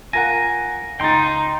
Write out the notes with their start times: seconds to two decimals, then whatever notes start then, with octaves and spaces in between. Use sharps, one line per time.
0.13 F4 A#4 F#5 G#5 A#6
1.00 C#2 D#4 G5 C6 A6